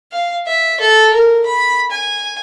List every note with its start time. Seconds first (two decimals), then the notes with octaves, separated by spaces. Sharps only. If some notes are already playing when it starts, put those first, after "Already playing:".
0.12 F5
0.47 E5
0.80 A4
1.13 A#4
1.45 B5
1.91 G#5